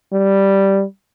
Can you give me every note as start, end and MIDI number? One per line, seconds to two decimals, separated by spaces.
0.13 0.83 55